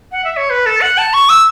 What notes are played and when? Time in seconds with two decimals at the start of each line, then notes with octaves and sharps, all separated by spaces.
0.12 F#5
0.24 E5
0.37 C#5
0.50 B4
0.66 A4
0.81 F#5
0.98 A5
1.13 C#6
1.29 E6